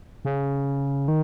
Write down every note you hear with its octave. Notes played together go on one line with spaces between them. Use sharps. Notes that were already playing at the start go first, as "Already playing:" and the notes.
C#3
D#3